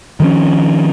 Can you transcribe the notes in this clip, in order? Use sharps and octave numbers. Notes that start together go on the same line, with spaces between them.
D#3 F3 C#4